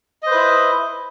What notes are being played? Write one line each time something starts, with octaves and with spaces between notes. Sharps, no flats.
E4 B4 C5 D#5